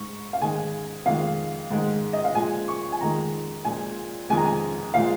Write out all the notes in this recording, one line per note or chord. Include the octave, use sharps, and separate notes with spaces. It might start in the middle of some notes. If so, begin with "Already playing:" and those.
Already playing: G#2 G#3 C#6
F5
G#2 D#3 G#3 G#5
F2 D#3 G#3 F5
G#2 D#3 G#3
D#5
F5
A#2 F3 G#3 G#5
C#6
G#5
F2 D#3 G#3 A#5
A#2 F3 G#3 G#5
F2 D#3 G#3 G#5
A#5
G#5
A#2 F3 G#3 F5